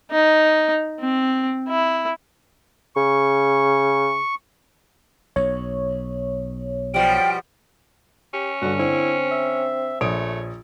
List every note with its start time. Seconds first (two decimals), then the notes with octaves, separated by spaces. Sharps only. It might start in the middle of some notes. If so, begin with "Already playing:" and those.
0.11 D#4
1.00 C4
1.69 E4
2.96 C#3 C#6
5.36 B1 C#5
6.94 B2 F3 G3 G5
8.34 C#4 G4
8.62 G2 D3 F#4
8.79 D3 C4 E4
9.31 E5
10.01 A#1 A3 C#5 D#6 D7